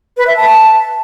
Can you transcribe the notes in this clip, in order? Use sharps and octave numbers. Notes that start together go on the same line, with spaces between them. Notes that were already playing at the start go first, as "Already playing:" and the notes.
B4
E5
A5